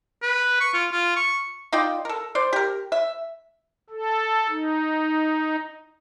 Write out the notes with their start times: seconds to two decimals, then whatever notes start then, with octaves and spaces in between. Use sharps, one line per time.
0.22 B4
0.61 C#6
0.74 F4
0.92 F4
1.16 C#6
1.73 D#4 F4 D5 G5
2.05 A4 A#4
2.35 C5 D5
2.53 G4 A#4
2.92 E5
3.90 A4
4.49 D#4